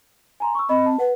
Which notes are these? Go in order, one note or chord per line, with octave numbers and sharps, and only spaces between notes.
G#5 A#5 C6
C#6 E6
C4 D#5 B5
A5
B4 F#5